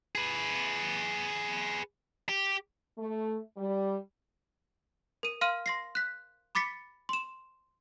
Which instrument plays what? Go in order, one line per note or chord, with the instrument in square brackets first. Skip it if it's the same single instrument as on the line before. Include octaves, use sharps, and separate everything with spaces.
[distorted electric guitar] G#4 B4
G4
[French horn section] A3
G3
[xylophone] A#4 D#7
F5 C6 F6 D#7
C6 A#6 C7
F#6 B6
B5 D6 A6 B6 C#7
C6 E7